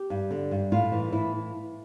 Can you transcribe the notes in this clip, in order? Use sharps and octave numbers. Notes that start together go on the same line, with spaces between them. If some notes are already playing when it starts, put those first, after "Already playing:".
Already playing: G4
G2
D3
G2
A2 F4
E3
A2 E4